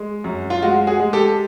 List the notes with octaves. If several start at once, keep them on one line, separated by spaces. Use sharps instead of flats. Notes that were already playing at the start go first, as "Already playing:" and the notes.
Already playing: G#3
F#2
F4
G#3 F#4
F#4 G#4
G#3
G4 A4